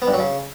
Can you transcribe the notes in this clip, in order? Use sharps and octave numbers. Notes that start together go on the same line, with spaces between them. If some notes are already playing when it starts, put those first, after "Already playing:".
B3
G2
F#3
C#3